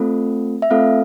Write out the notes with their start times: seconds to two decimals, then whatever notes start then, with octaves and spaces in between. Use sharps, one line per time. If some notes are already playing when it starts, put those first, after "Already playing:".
Already playing: A3 C4 F4 A4
0.62 E5
0.71 A3 C4 F4 A4 F5